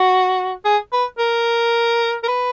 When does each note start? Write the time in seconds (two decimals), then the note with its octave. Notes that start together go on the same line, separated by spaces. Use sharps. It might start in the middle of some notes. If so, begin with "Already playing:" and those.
Already playing: F#4
0.65 G#4
0.93 B4
1.19 A#4
2.23 A#4
2.28 B4